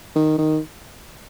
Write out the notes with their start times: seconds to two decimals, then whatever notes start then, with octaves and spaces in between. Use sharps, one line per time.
0.16 D#3
0.39 D#3